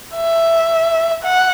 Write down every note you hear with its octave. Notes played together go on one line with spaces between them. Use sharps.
E5
F#5